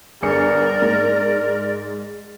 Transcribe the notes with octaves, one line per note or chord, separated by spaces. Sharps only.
G1 G#4 A#4 D5 C#7
G#2